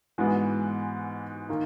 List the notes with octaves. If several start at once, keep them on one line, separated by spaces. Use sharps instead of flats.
G#2 E3 G#3 B3 F#4
D#3 A#3